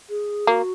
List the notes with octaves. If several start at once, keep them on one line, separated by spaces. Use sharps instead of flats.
G#4
A#3 F#4